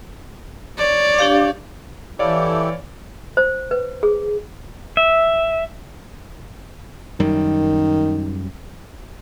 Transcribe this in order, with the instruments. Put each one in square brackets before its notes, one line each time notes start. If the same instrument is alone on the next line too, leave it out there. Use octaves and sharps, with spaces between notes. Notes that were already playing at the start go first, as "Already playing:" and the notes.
[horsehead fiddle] C#5 D5
[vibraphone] D4 G4 F5
[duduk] E3 [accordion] E4 G4 A4 [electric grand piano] C#5 D5 F5
[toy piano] C5
B4
G#4
[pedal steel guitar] E5
[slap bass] F#2 G3 [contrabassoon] D#3